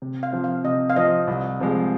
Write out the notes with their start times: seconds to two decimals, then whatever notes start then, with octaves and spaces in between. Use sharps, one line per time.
0.02 C3
0.23 F5
0.32 F3 C4 F4
0.44 F5
0.64 C3 D#5
0.90 F5
0.96 F3 C4 F4 D#5
1.27 C2
1.60 C3 F3 G#3